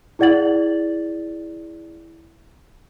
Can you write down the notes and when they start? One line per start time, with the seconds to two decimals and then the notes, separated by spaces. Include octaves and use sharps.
0.19 E4 G#4 D5 F#5 A6 F#7